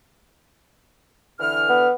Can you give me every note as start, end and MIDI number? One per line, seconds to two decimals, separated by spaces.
1.40 1.87 50
1.40 1.87 52
1.40 1.87 89
1.69 1.94 59